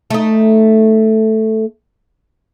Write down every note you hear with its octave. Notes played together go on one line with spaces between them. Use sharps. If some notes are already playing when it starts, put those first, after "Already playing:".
A3 D#4